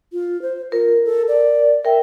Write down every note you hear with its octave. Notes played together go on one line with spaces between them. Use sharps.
F4
C5
F4 A#4
A4
D5
A#4 E5 G5